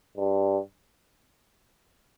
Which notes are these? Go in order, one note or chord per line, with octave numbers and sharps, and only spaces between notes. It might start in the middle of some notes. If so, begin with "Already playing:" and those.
G2